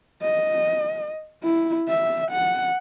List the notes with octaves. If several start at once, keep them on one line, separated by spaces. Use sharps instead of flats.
D#5
E4
E5
F#5